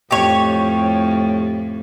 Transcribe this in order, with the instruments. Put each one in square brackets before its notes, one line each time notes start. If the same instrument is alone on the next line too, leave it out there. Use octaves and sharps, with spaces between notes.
[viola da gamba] F2 A2 [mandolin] G4 C#5